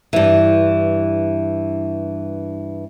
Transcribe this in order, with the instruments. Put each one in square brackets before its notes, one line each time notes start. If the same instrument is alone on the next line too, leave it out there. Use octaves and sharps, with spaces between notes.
[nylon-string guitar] G2 E3